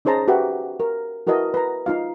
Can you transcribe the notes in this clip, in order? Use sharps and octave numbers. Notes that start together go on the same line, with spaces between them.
C#4 D#4 G#4 C5 A5 A#5
F#4 G4 B4 E5 F#5
A#4
E4 F#4 A#4 B4 D#5 A5
B4 A#5
D#4 F4 F5